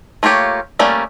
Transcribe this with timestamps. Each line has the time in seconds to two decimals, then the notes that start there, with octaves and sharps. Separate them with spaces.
0.23 A3 A#3 F4 G4 C#5
0.79 G3 A3 A#3 C#4 D5